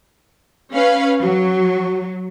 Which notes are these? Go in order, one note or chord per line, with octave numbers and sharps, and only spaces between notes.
C#4 B4 F5
F#3 F#4